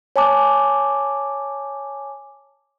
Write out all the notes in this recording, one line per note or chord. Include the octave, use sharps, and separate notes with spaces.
C#5 G#5 A5 D6